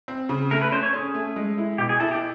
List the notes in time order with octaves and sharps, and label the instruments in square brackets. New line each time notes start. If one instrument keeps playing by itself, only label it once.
[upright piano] C4
C#3
[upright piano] A3 [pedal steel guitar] A#4
[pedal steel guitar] B4
[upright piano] C#4 [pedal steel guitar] C5
[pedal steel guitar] C#5
[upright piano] C#4 [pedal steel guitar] G#4
[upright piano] A3
G#3
E4
[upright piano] B2 [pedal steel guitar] G4
[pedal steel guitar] G#4
[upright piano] E4 [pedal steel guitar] A4
[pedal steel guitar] G4